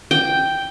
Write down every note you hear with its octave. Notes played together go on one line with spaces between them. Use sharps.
G5